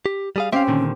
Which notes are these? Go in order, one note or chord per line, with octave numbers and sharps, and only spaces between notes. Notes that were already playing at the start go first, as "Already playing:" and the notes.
G4
G3 G#4 F5
C4 C#4 G4 E5 F5
A#2 D3 D#3